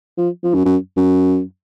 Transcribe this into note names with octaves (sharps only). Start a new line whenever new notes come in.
F3
F3
F#2
F#2
F#2